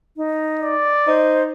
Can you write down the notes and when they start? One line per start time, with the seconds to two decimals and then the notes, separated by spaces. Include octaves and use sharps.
0.17 D#4
0.59 D5
1.07 D#4 C5